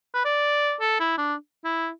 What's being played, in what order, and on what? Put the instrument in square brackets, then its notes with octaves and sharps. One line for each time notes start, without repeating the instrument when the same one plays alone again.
[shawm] B4
D5
A4
E4
D4
E4